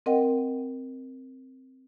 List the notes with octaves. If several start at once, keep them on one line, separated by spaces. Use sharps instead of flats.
C4 A#4 D#5 F#5 G5